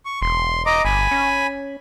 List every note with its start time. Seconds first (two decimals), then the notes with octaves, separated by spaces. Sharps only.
0.05 C#6
0.22 E1 C6
0.66 D#5 A#5 D6
0.85 G1 G#5 B5
1.11 C#4